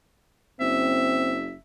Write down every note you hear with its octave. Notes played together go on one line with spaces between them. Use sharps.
F#1 C4 E5